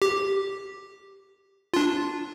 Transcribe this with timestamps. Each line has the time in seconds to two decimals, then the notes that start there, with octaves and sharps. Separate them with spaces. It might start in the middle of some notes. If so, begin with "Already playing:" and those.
0.02 G4
1.74 D4 F4